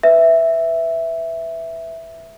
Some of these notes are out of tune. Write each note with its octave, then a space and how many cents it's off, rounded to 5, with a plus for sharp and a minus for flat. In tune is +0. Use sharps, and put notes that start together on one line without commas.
B4 +5 E5 +0